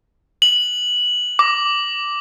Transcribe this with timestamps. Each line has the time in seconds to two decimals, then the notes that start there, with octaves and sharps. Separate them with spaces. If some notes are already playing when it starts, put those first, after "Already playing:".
0.42 F#7
1.39 D6